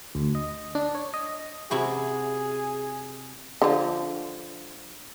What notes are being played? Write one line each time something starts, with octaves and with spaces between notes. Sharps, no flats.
D2
D#5
D4
C#5
D#5
C3 E4 F#4 G#4
D3 F3